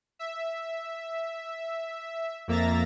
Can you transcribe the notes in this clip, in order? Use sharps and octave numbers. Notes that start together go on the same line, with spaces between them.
E5
F2 A#3 E5 A#5 A6 A#6